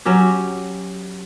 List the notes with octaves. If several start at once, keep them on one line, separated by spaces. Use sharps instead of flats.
F#3 C#4 G4